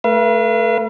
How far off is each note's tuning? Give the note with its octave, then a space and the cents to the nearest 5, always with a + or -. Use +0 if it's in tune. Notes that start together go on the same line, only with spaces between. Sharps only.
A3 +0 B4 -35 F5 -45